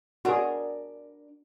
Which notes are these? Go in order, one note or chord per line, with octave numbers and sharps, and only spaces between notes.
D4 F#4 G#4 A#4